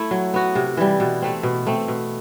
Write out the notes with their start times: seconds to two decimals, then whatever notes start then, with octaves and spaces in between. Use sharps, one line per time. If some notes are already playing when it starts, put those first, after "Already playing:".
Already playing: A3 E4
0.11 F#3
0.34 B3 F#4
0.55 C3
0.77 E3 G3
1.00 B2
1.22 A3 C4
1.43 B2
1.67 A3 C4
1.88 B2